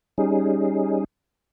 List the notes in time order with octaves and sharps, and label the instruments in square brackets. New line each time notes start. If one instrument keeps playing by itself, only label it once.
[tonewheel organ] G3 C#4 D#4 G#4